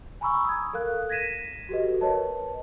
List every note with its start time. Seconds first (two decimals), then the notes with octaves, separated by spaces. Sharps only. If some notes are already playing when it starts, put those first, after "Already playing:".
0.21 G#5 A#5 B5 C#6 E6
0.45 D#6 G#6
0.73 A4 A#4 F5 F#6
1.09 G#6 A#6 B6 D#7 E7
1.69 F#4 G4 A4 B4 D#5
2.01 A#4 B4 C#5 D#5 A5